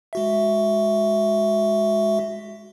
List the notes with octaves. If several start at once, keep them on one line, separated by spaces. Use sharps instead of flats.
G#3 F#4 E5